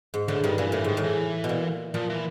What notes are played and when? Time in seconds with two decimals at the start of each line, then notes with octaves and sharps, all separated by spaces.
0.14 G#2
0.28 A2 D3
0.44 G2 D#3
0.58 A#2 E3
0.72 A2 E3
0.84 G#2 D#3
0.97 A2
1.04 E3
1.44 B2
1.49 A#2
1.94 A#2 F3
2.10 E3